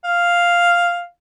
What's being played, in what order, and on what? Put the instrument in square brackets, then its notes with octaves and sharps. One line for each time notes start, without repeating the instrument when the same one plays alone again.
[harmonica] F5